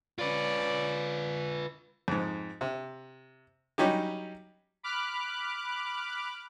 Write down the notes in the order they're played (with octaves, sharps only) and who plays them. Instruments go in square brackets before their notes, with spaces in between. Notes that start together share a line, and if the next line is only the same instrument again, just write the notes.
[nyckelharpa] C#4 D5 [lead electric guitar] F4 B4
[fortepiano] F2 G#2
C3
F#3 G3 C#4 D#4 G4
[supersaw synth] B5 D6 F6 F#6